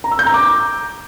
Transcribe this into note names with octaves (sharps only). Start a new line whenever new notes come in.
A#5
E6
G6
A#5
D6